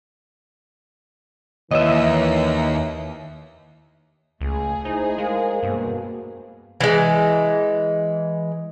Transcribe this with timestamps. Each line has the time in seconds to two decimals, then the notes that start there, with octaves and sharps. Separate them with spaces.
1.71 D#2 E3 C#5 D#5 E5
4.41 C#2 A3 G#4
4.85 D#4 E4 C5 D#5
5.18 G#3 A#4 C5 F5
5.63 G2 B2 A#3
6.80 E3 G#3